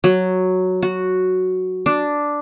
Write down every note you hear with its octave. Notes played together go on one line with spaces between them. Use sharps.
F#3
F#4
D4